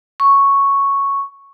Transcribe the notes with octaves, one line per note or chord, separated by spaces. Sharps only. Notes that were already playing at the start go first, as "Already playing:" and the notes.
C#6